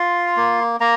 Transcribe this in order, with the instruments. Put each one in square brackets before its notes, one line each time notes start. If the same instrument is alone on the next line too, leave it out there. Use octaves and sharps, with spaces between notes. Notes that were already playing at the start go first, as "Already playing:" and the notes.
Already playing: [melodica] F4 C6
A#3
A#3 A#5